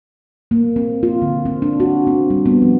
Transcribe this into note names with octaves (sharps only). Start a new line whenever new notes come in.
A#3
C4
F4
D3
C4
D4
F#4
C4
G3
B3
F3